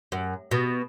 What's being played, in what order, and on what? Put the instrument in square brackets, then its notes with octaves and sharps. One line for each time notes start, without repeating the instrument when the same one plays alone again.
[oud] F#2
B2